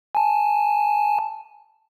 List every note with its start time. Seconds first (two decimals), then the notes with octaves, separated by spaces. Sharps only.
0.15 G#5 A5